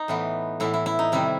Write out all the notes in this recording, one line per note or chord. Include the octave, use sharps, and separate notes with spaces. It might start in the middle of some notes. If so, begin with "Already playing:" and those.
Already playing: D#4
A2 E3 B3
A2 E3 B3 E4
E4
E4
D#4
C3 D#3 G3 E4